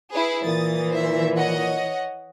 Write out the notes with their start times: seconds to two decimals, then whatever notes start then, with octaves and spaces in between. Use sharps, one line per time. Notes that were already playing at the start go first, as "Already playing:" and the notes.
0.13 E4 G#4 B4
0.46 A#2 E3 D#6 A6
0.89 C5 E5
1.38 C#5 D#5 F#5